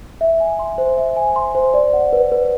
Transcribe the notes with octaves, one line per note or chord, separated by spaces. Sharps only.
E5
G#5
C6
C5
E5
G#5
C6
C5
D5
F#5
B4
B4